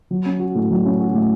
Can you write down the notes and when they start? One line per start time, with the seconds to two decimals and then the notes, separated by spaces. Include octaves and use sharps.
0.11 F#3
0.26 C#4
0.40 F#4
0.55 A2
0.70 F#3
0.85 C#4
0.99 F#4
1.14 A2